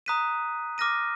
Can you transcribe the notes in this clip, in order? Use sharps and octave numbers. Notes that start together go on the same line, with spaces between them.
A#5 D#6 F#6 B6 D#7
D6 F6 A#6 D#7